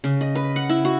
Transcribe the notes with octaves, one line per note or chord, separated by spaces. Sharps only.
C#3
D#5
B4
F#5
E4
F#4